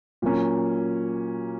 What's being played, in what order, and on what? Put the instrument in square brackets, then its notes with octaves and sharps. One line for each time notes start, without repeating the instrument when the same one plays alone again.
[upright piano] A#2 F#3 A#3 C#4